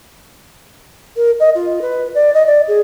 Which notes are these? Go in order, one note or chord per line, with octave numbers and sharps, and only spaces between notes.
A#4
D#5
F4
B4
D5
D#5
D5
G#4